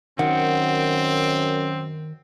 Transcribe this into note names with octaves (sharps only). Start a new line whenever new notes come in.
F#2 D#3 C4 F#5